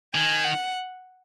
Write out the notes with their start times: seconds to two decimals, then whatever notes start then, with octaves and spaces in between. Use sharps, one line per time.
0.14 D#3 G#5
0.45 F#5